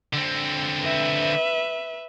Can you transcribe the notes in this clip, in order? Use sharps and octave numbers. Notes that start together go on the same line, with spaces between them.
D3 C4
B4 E5